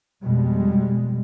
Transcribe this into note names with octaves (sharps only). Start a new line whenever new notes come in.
F2 B2 G3 G#3